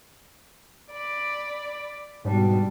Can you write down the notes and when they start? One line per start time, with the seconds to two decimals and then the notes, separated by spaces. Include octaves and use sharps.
0.91 D5 B5
2.25 G#2 B2 G3 D4